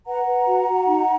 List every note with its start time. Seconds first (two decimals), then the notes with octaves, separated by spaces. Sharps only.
0.06 B4 F#5 A#5
0.26 B4
0.46 F#4
0.67 F#4
0.86 D#4